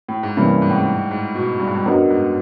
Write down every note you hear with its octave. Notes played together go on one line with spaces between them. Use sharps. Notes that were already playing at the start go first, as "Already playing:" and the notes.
A2
G#2
G2 C3 E3 G3 A#3 C#4
G#2
A2
G#2
G#2
B2
G2
G#2
G2
F#2 B3 D4 F#4 A#4 D#5
G#2